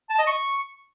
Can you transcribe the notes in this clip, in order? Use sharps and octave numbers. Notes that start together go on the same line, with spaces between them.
A5
D#5
C#6